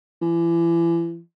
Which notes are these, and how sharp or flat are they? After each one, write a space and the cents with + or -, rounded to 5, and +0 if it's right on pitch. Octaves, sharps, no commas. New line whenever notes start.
E3 +35